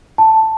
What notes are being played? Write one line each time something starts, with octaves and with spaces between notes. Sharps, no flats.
A5